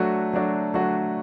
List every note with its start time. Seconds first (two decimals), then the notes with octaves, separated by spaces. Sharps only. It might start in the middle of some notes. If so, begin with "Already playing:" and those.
Already playing: F#3 A3 D4 F#4
0.33 F#3 A3 D4 F#4
0.74 F#3 A3 D4 F#4